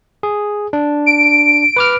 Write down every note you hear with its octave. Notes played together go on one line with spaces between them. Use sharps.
G#4
D4
D7
B4 D6 F6